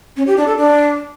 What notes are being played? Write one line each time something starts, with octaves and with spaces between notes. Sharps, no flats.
C#4
G4
D4
A4
D4